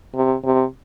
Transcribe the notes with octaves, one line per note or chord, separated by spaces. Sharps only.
C3
C3